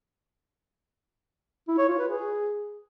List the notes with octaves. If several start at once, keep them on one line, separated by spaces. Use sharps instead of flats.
E4
C#5
F4
B4
G#4